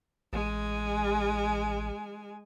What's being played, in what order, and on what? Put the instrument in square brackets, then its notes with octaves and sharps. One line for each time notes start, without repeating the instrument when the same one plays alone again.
[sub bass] A1 [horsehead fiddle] G#3 G#5